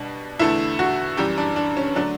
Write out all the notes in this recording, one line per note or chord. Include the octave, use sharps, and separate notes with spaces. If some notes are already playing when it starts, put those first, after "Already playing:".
Already playing: B2 G3 D4
E2 D3 A3 E4
F#4
F#2 E3 G3 G4
D4
D4
C#4
D3 F#3 A3 D4